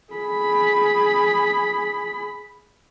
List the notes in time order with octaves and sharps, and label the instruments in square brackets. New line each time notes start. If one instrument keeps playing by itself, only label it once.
[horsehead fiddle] G#4 B5